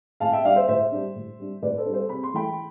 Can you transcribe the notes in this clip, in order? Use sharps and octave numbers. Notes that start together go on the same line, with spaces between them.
A2 F5 A5
E5 G5
G3 D4 D5 F5
C5 E5
A2 C5 E5
G3 D4
A2
G3 D4
A2 B4 D5
A4 C5
G3 D4
A4 C5
C3 B5
C6
E3 A3 E4 G5 B5